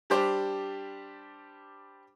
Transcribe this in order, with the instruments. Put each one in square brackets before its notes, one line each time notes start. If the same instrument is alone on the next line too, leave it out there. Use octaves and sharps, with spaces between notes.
[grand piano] G3 D4 G4 C5